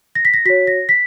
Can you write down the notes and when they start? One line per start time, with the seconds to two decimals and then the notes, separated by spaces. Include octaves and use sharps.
0.15 A#6
0.25 B6
0.34 A#6
0.45 F#4 C#5 B6
0.67 A#6
0.89 B6